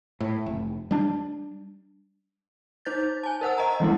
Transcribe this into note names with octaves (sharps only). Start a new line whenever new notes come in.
A2
F1
G3 D4
D#4 C5 G6 A6
G#5 A5
A#4 C5 F#5 E6
D#5 A#5
E3 G3 G#3 A#3 B3 E4